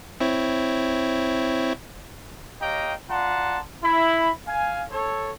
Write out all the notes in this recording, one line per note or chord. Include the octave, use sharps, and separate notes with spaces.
C4 E4 C#5
G4 C#5 D#5 F5 G5 A#5
F4 D5 F#5 A5 A#5 C6
E4 B5
F5 G#5
A4 C#5